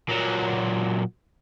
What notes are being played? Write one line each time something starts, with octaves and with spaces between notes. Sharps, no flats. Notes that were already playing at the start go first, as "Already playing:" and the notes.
A#2 F#3